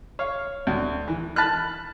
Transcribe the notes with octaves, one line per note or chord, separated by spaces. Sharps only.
C#5 F5
D2
E3
A5 B5 F6 F#6